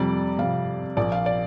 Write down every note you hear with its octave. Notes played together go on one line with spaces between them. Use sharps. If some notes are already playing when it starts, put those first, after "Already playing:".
Already playing: F2 C3 G3 D5
F2 C3 G3 F5
A#1 A#2 F3 D5
F5
D5